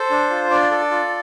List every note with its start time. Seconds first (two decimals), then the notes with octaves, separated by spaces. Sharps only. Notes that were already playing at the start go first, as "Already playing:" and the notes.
Already playing: A4 C5
0.11 D4
0.30 F4
0.50 D4 D5
0.71 A4
0.91 F4